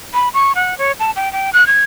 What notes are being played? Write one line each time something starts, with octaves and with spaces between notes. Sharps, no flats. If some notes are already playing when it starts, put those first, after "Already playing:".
B5
C#6
F#5
C#5
A5
G5
G5
F#6
G#6